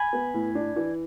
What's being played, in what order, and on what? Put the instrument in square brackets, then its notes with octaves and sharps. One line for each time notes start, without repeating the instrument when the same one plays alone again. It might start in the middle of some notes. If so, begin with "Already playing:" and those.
Already playing: [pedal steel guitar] G#5 B5
[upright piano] B3
A2
D4
E3